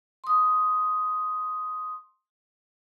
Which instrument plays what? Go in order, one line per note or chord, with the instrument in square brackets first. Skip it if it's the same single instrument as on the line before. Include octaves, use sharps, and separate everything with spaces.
[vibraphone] C6 D#6